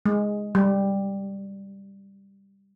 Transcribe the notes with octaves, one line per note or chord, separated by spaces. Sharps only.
G#3
G3